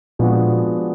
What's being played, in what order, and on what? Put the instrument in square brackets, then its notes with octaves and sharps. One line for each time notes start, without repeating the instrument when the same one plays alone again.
[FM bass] A#2 [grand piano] F3 G#3 B3 D4 F#4